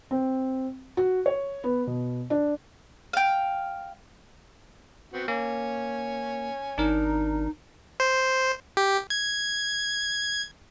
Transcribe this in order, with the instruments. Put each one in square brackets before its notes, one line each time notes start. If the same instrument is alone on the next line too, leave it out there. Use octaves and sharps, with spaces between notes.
[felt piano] C4
F#4
C#5
B3
B2
D4
[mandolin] F5 G5
[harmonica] B3 C4 F#4
[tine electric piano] A#3 [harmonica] C#5 G#5
[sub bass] G#1 [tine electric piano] D4 A#4 [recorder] D#4
[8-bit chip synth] C5
G4
G#6